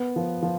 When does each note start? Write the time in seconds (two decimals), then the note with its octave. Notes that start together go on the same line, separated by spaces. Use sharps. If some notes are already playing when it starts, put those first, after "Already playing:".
Already playing: B3
0.16 F3
0.42 F3